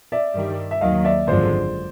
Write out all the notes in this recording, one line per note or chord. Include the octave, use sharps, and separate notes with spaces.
D5 E5
G2 D#3 G3
E5
D#2 D#3 F#3 D#5 F5
D5 E5
G#1 F#2 D3 F3 G#3 C5 D5